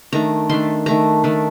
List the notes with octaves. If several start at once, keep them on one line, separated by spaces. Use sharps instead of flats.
D#3 A3 D4 A#5
D#3 A3 D4 C6
D#3 A3 D4 A#5
D#3 A3 D4